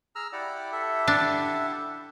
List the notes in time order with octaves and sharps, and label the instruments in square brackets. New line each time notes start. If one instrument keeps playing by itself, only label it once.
[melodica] G#4 [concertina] A#5 E6 F6
[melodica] E4 G4 F#5 [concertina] D5
[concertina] A4 E5
[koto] D4